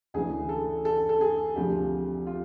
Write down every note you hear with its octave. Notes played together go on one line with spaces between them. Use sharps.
D2 C#3 E3 G#4
A4
A4
A4
G#4
D2 C3 F3 G4
F4